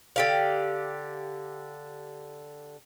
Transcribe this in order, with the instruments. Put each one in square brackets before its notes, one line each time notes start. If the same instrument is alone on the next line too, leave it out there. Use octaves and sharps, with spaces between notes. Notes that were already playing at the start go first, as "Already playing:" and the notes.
[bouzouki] D3 G4 F5